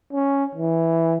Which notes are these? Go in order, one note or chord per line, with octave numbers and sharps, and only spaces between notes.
C#4
E3